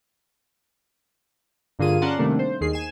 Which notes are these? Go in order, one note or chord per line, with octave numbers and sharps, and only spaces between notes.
G2 D3 A#3 F4 G#4 D#7
C#4 A#4 D5 F#5 A5 C6
C3 D#3 G3 A3 A#3 D4
C5
D#2 D#3 G#4 C7
G#5 E7